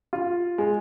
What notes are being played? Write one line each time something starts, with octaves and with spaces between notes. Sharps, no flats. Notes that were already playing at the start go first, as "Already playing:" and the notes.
F4
G#3